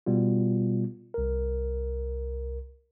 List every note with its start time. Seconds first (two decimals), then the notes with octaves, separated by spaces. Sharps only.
0.06 B2 G3 B3 F4
1.14 C2 A#4